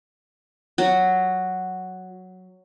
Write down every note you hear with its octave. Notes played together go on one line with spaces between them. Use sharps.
F#3 F#4